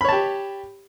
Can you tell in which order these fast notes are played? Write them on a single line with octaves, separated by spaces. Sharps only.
B5 C#5 A5 G4